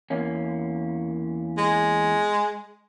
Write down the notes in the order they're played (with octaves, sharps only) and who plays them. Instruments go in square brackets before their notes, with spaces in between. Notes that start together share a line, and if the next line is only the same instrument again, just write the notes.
[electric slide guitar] E2 A#3 C#4
[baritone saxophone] G#3